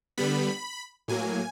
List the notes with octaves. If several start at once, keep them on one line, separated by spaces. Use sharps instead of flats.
D3 G3 B3 B5
A2 F#3 A#3 G#5